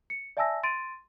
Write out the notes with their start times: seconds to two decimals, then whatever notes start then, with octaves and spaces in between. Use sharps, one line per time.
0.10 C#7
0.37 D5 E5 G#5 A5 E6 A#6
0.63 C6 A6 D7 D#7